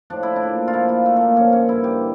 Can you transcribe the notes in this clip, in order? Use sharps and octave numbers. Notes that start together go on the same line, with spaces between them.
A2 F3 D4
E4
D4
A#2 F3
F4
A#2 F3 E4
F4
A#2 F3 A3
A3 A#3
G2 F3 C#4
C#4
G2 D3 F3 E4
G4